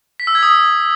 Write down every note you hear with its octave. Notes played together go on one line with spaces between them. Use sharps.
B6
E6
G#6
D#6